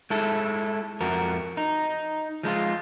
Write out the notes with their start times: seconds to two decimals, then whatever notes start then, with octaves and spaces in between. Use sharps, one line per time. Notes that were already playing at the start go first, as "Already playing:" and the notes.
0.10 G#3 E4 A4
1.01 F2 F#4 A#4
1.57 D#4
2.43 F3 G#3 D4 F4